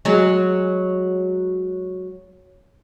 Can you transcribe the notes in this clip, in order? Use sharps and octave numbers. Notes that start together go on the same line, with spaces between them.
F#3 G#3